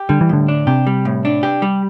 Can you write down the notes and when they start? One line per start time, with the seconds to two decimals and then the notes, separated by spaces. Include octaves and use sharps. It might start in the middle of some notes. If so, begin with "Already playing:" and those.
Already playing: G4
0.09 D3 G3
0.21 E3
0.29 A2 D3
0.48 D4
0.67 C3 G4
0.87 G3
1.05 A2
1.25 D4
1.43 G4
1.62 G3